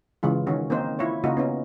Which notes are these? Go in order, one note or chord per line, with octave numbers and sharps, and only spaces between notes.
C#3 E3 G#3 F4
D#3 C#4 F#4
A#3 C4 D#4 C5
E4 F4 C#5
C#3 A#3 D#4 F4 F#4
B3 C#4 D#4